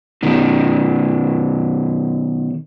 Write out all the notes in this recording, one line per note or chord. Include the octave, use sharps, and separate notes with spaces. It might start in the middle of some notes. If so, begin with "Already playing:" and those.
B2 D#3